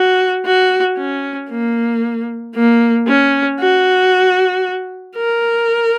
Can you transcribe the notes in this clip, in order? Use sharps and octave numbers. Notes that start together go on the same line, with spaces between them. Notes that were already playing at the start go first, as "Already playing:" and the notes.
Already playing: F#4
F#4
C#4
A#3
A#3
C#4
F#4
A#4